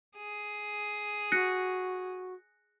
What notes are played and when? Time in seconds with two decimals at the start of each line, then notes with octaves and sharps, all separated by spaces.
0.17 G#4
1.32 F#4 F#6 A#6 C#7